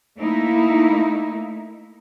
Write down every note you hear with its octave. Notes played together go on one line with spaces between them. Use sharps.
A3 A#3 D#4 E4